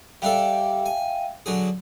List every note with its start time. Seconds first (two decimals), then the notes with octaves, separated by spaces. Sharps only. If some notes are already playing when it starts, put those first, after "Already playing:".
0.22 G3 D4 A4 E5 F5 G5
0.86 G#5
1.46 D3 F#3 G#4